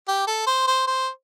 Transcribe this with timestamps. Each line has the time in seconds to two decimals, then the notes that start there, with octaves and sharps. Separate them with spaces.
0.08 G4
0.27 A4
0.47 C5
0.67 C5
0.87 C5